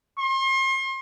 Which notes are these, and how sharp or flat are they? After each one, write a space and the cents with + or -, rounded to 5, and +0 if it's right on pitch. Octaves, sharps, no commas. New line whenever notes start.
C6 +40